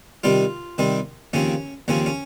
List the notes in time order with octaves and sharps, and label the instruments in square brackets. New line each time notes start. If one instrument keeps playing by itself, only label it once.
[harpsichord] C3 D#3 G3 C4 F4
C3 D#3 G3 C4
D#2 C#3 F3 C4 C#4
D#2 C#3 F3 C4 C#4
C#4